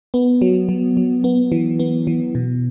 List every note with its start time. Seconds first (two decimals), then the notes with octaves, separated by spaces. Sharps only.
0.14 B3
0.42 F#3
0.69 F#3
0.97 F#3
1.24 B3
1.52 E3
1.79 B3
2.07 E3
2.35 B2